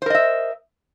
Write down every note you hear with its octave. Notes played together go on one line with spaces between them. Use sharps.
A#4 C5 D#5 E5